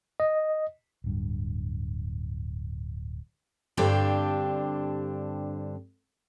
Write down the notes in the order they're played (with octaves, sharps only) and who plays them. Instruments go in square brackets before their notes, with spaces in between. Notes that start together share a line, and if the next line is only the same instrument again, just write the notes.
[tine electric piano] D#5
[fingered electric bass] D1 G2
[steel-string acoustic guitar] G2 D3 C4 D4 G4